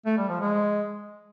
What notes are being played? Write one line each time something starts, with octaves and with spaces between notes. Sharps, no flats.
A3
G3
F3
G#3